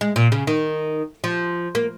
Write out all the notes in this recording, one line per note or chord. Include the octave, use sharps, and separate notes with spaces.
G#3
A#2
C#3
D#3
F3
A#3